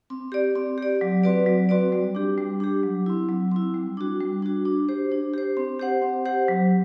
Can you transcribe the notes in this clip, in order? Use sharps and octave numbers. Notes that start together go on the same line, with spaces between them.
C4
G4 D5
C4
G4 D5
F#3
C4 F#4 B4 D5
F#3
C4 F#4 B4 D5
G3
D4 G4
G3
D4 G4
F#3
C4 E4
F#3
C4 E4
G3
D4 F#4
G3
D4 F#4
D4
G4 C5
D4
G4 C5
C4
G4 C5 F#5
C4
G4 C5 F#5
F#3